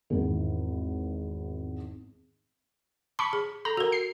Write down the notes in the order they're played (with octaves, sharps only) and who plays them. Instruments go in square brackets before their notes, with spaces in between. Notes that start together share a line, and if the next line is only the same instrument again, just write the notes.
[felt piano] G#1 E2
[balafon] A5 [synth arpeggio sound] B5 C#6
[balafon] G#4
[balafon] A4 [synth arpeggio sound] A#5
[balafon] F#4 A#4
[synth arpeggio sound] C7